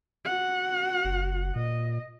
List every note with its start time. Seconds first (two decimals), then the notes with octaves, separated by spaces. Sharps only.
0.25 F#4 F#5
1.05 F#1
1.56 A#2 D#5